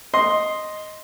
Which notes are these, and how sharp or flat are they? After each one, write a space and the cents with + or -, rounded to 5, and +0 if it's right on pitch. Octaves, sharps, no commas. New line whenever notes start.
D#5 +0 C6 +0